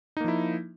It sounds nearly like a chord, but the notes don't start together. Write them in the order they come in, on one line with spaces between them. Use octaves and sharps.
D#4 A#3 F3 E4